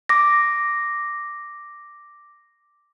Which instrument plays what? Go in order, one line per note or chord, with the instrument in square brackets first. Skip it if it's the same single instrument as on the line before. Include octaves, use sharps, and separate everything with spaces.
[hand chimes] D6 A#6